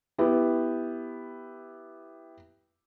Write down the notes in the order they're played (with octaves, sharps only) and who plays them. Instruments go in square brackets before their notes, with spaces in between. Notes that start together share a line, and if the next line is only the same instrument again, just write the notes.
[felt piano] B3 E4 G4